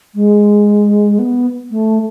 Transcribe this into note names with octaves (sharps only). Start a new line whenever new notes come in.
G#3
B3
A3